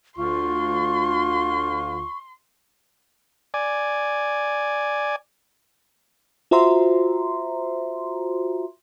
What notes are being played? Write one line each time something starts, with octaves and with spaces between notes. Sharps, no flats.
D2 F4 C6 C#6
D5 G#5
F4 F#4 C5 E5 A#5 C6